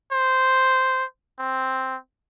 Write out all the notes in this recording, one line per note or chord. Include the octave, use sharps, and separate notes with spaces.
C5
C4